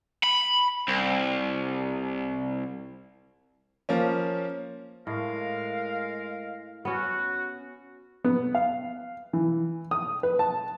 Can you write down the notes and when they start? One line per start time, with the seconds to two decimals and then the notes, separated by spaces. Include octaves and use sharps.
0.23 B5
0.88 C2
3.89 F3 A#3 C#4
5.07 A2 G#3 A#4 F5
6.85 B3 C#4 F#4
8.25 B3
8.55 F5
9.33 E3
9.91 D#6
10.23 B4
10.39 A5